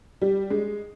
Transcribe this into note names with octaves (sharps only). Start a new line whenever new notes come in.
G3
G#3